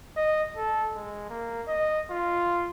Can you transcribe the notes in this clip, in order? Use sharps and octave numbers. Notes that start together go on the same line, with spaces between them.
D#5
A4
G#3
A#3
D#5
F4